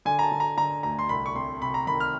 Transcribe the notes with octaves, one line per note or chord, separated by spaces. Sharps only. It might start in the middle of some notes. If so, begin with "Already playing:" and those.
D3 G#5
A#5
A5
D3
A#5
D3 A#5
D2 A#5
C6
C2 B5
C#6
C3 C6
C3 B5
A#5
D#3 B5
F6